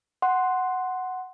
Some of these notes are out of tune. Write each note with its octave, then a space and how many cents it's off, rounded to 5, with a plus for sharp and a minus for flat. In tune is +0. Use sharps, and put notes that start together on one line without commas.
F#5 +0 C6 +0